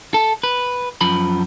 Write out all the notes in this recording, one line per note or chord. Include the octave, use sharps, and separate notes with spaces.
A4
B4
F#2 F3 B5